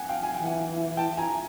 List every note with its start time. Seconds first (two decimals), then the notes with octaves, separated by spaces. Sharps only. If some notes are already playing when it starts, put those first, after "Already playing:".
Already playing: F#5 G#5
0.09 F5 G5
0.23 G#5
0.35 E3 G5
0.45 F#5 G#5
0.97 G5 A5
1.17 G#5 A#5